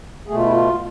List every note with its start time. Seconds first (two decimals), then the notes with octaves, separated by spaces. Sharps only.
0.27 B2 A3 G#4
0.36 F4
0.44 E4
0.52 F4